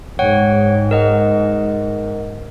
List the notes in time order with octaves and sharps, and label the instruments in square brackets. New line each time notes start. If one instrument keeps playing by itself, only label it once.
[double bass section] G#2 [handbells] C#5 F#5 G5
[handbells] A#4 D#5 F#5